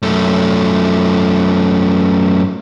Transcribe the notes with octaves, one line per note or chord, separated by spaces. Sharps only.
F#2 A3